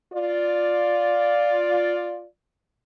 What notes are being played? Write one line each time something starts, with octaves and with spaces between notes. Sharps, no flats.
F4 D5